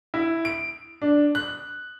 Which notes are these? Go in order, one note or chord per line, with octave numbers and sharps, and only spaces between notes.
E4
D7
D4
F#6